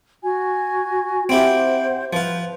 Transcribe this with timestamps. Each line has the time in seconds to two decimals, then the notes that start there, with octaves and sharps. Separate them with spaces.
0.23 F#4 G#5
1.29 C4 E4 G4 C5 F#5
2.13 F3 F4 B4